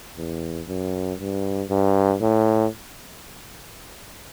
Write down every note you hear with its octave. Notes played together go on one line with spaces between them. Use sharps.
E2
F#2
G2
G2
A2